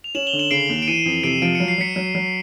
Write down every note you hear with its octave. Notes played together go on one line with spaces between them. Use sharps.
F7
C#4 E7 F#7
F7 G7
D3
E7 F#7
C#3 C7 D7
D#2
D7
E3 C#7 D#7
F2
C3 C7 D7
F3 D7
F#3 C#7
C7
F#3 B6 C#7
F#3
F#3